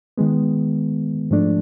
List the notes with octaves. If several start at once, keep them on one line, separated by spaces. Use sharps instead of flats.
D#3 G#3 B3
G#2 F3 A3 D4